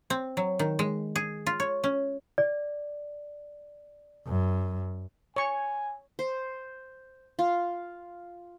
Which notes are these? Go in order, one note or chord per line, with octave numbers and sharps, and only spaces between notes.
C4
F#3
D#3
G#3
G#4
F4
C#5
C#4
D5
F#2
C#5 G#5 C#6
C5
F4